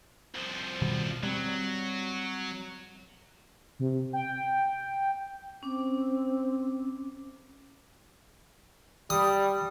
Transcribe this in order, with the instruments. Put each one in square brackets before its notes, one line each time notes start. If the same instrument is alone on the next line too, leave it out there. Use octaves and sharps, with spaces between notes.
[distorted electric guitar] C2 F3
[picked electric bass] B2 D#3 G3
[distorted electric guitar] F#3 [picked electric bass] G3 C4
[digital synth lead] C3
G5
[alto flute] C4 [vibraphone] C#4 D6
[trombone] G3 [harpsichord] D#6